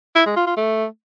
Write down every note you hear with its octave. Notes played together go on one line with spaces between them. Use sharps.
E4
G#3
F4
F4
A3